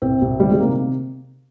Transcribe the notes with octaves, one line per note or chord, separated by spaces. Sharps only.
C2 C4
C2
D#3 G3
G#3
C3 A#3